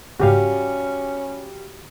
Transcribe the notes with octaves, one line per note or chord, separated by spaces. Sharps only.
G#2 C#3 G3 C#4 F#4 G4 F5